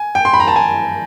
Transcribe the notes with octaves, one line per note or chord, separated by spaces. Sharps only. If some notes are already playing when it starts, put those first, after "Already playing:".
Already playing: G#5
G5
C6
B5
A#5
A5
G#5